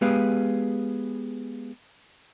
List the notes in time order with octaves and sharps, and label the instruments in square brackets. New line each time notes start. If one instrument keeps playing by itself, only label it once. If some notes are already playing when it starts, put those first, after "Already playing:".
[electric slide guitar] G#3 B3 G4 G#4 B4 F5